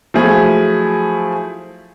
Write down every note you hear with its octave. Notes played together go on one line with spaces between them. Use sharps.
F3 F#3 A3 E4 G#4